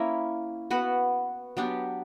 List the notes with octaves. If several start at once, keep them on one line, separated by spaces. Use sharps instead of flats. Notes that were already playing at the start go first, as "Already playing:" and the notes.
Already playing: A#3 C#4 E4 A#4
B3 F#4 B4
F#3 B3 D4 G4